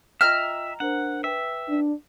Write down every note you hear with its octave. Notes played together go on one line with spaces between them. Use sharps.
F4 D#5 E5 G5 A#5 F6
D4 A#4 C5 F#5
B4 E5 G5
D4